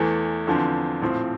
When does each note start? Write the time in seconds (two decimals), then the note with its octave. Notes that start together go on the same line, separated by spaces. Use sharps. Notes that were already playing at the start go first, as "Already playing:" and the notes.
Already playing: E2 E3 A3
0.47 E2 D3 F3 C4
1.02 A#1 A2 F3 C4